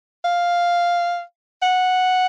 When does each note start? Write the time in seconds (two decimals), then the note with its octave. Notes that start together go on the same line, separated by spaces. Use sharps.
0.25 F5
1.63 F#5